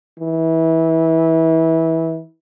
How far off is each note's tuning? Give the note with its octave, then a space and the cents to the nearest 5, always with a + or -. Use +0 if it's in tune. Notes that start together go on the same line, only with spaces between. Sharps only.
E3 -25